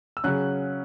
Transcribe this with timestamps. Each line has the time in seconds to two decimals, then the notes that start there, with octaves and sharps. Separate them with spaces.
0.17 E6
0.24 C#3 F#3 C#4 F#6